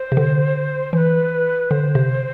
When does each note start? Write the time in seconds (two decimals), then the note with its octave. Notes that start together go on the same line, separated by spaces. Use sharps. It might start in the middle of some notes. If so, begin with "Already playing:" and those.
Already playing: C5
0.12 C3
0.17 D3
0.93 E3 C5
0.98 B4
1.70 D3 C5
1.95 C3